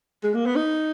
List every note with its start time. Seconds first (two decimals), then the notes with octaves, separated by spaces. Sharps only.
0.23 G#3
0.34 A#3
0.46 B3
0.56 D#4